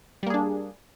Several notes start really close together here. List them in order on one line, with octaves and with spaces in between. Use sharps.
G3 A#3 G#4 D4